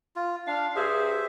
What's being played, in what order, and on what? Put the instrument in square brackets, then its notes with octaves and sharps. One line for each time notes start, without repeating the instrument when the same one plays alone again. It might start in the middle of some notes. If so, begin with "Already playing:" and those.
[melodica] F4
[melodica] D4 [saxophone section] F5
[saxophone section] G2 G#4 [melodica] C5 E5